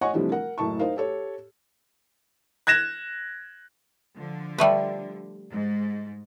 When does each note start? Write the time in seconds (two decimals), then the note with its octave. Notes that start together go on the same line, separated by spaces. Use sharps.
0.01 C#5 D#5 F#5 G#5 C#6
0.13 C3 E3 F3 G3 A3 D4
0.32 A#4 F#5
0.58 F#1 A2 A5 C#6
0.79 D#4 A#4 C5 F5
0.97 G4 A4 C#5
2.67 F#6 G#6 A#6 E7
4.17 D3 F3
4.58 G3 A3 B4
5.51 G#2